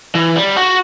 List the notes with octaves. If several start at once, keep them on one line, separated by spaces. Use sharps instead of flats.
E3
G3
F#4